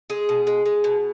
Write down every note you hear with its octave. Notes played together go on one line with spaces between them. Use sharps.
G#3 G#4
B2
G#3
G#3
B2